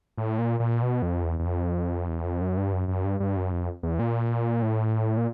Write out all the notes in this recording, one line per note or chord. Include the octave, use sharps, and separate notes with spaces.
A2
A#2
A#2
B2
F2
E2
E2
F2
E2
F2
F#2
G2
F#2
F#2
G2
G2
F#2
F2
E2
A#2
A2
A#2